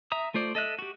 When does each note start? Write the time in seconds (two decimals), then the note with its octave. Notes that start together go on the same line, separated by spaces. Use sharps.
0.12 E5 A#5 D#6
0.34 A3 F4 C5 D5
0.55 A4 D#5 E5 F#6
0.79 F#4 G4